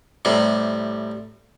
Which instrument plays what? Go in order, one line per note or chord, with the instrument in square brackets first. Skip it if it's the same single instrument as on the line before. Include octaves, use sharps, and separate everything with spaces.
[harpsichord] A2 C3 G3